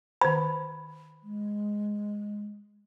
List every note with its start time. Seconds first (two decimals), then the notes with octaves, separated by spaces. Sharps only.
0.21 D#3 C5 B5
1.23 G#3